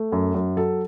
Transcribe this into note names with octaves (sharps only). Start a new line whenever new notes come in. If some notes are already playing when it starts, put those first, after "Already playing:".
Already playing: A3
F#2
F#2
F#3 A4